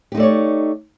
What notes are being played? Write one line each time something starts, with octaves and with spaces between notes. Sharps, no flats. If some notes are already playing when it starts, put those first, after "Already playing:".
A3 D#4 G4 C#5 D5